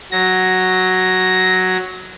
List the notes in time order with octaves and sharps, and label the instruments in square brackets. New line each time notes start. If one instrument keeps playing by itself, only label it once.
[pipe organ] F#3 A#6